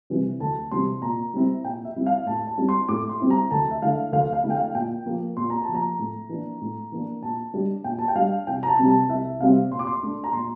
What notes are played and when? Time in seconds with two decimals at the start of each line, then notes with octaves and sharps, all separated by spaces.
0.10 C3 E3 G3 C4
0.40 D2 A5
0.71 C3 E3 G3 C4 C6
1.02 A#2 A#5
1.34 G3 C4 E4
1.64 A#2 G5
1.85 E5
1.96 G3 C4 E4
2.06 F5
2.26 A2 A5
2.47 A5
2.58 G3 C4 E4
2.69 C6
2.89 A2 D6
3.09 C6
3.20 G3 C4 E4
3.30 A#5
3.51 D2 A5
3.71 E5
3.82 D3 A3 E4 F5
4.12 D2 F5
4.33 F5
4.43 D3 A3 E4
4.50 G5
4.55 F5
4.75 A#2 G5
5.06 F3 A#3
5.37 A#2 C6
5.50 A#5
5.62 A5
5.68 F3 A#3
5.75 A#5
5.99 A2
6.29 E3 A#3 D4
6.61 A2
6.92 E3 A#3 D4
7.23 A#2 A5
7.54 G3 D4
7.84 A#2 G5
7.99 A5
8.08 G5
8.15 G3 D4 F5
8.47 C2 G5
8.63 A#5
8.67 A5
8.78 C3 G3 C4
8.88 A5
9.09 C2 E5
9.40 C3 G3 C4 F5
9.71 A#2 C6
9.79 D6
9.87 C6
10.02 A3 D4
10.24 A#5
10.33 A#2 C6